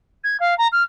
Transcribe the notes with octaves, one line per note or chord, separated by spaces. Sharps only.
G#6
F5
A#5
F6